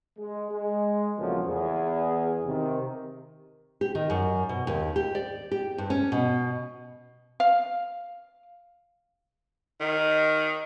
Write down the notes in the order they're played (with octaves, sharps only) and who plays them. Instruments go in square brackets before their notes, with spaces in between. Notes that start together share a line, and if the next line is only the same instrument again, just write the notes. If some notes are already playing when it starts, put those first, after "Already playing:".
[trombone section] G#3
G#3
C2 A#2 C#3 F3 F#3 A3
E2 G#4
C3 D#3
[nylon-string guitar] G4
D#3
F#2
B2
D#2
G4
D5
G4
G2
C#4
B2
[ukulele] F5
[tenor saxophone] D#3 [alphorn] D#4